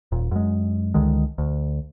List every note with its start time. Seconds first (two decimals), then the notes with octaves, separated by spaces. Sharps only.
0.12 D#1 A#2
0.31 F#2 G#3
0.94 C#2 D3 D#3 G#3
1.38 D2